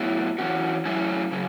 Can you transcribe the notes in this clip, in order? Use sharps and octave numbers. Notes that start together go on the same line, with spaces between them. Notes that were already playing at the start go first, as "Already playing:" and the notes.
Already playing: A2 F#3 B3 E4
E3 C#4 F#4
F#3 A3 C#4 E4
C#3 F#3